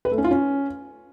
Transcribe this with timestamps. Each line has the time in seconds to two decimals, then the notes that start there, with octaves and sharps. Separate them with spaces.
0.05 B4
0.11 A3
0.18 C#4
0.24 F4
0.31 C#4